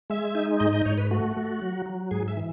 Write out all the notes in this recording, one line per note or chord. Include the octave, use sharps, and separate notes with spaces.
G#3 E5
D#4
G#2 D#5
D#5
G#2 C#5
B4
A3 F#4
A3
F#3
F#3
G#2 G#4
E5
E3